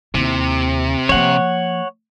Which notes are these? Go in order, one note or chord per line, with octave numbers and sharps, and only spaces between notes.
D#2 C3 E4
F3 A#3 C#5 F#5